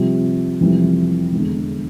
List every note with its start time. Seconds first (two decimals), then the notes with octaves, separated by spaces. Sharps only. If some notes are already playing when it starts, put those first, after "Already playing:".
Already playing: C2 C3 F3
0.61 F1 F2 C3 E3 G3
1.32 E1 E2 D3